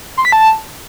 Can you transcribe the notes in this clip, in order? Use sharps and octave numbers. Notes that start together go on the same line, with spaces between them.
C6
B6
A5